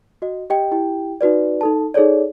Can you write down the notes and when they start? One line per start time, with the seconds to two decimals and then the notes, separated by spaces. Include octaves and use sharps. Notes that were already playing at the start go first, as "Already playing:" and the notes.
0.22 F#4 D#5
0.50 G4 D#5 G5
0.72 E4 G4 G5
1.21 D#4 F#4 B4 D5
1.61 D#4 A4 A5
1.94 D#4 G#4 A4 C#5 D5